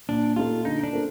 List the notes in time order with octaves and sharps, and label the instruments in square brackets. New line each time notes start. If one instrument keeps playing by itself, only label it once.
[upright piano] A#2 [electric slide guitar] D4
[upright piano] A3 D#4 G4 [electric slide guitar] F4
[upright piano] D3 [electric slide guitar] D#4
[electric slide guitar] D4
[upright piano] A3 C4 F4 A#4